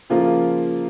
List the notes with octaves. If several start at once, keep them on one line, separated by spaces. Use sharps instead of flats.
C#3 F3 A#3 F4